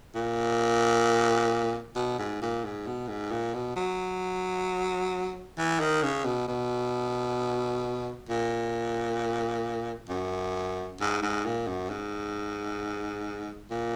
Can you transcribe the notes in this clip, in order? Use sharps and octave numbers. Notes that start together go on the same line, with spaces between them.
A#2
B2
G#2
A#2
G#2
B2
G#2
A#2
B2
F#3
E3
D#3
C#3
B2
B2
A#2
F#2
G#2
G#2
A#2
F#2
G#2
A#2